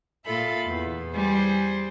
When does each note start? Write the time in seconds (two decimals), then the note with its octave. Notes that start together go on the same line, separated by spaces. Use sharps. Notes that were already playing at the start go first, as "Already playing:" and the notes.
0.25 A#2 F4 A4 E5 B5
0.66 E2
1.14 G3 G#4 C5